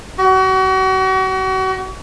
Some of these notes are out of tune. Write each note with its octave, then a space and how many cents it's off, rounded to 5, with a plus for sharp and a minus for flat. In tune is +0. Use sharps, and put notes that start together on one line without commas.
F#4 +35